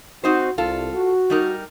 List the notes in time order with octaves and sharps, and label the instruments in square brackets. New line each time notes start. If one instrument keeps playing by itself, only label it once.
[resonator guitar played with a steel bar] C4 D#4 C5 [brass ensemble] F#4
[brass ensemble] C2 [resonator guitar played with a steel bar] F4 A4
[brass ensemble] F#4
[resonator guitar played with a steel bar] G3 D#4 A#4